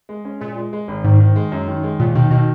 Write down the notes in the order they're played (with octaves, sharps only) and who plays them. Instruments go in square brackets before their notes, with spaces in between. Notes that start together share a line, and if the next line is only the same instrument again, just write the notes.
[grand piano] G#3
C#4
[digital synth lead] A#2 [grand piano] G#3
[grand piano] G#3
G#3
G#1
[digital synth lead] G#2 [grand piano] D#3
[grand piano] D#3
G#3
F#2
D#3
G#3
[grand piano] D#2 [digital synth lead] A#2
[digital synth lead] B2 [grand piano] D#3
[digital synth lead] B2 [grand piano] D#3